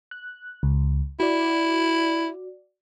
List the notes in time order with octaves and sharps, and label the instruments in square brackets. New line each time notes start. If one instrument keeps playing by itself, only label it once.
[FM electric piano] F#6
C#2
[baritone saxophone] E4 [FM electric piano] F#4 D5